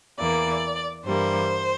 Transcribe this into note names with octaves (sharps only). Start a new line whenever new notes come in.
E2 E3 A#3 D5
G2 E3 G3 A#3 C5